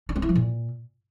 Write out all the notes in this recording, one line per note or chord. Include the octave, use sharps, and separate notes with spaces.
D4
C4
E4
F3
A#2